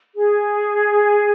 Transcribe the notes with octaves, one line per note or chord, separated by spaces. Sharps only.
G#4